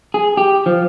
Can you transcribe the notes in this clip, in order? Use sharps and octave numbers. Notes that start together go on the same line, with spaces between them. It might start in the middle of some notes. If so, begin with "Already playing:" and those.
G#4
G4
F3